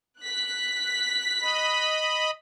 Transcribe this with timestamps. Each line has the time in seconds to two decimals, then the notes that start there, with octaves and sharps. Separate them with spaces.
0.21 F#6 B6
1.42 D#5 B5